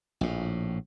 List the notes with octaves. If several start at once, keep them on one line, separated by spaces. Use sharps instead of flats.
A#1 A2